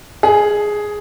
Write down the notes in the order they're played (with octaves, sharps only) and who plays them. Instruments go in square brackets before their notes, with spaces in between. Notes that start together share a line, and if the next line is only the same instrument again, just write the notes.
[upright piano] G#4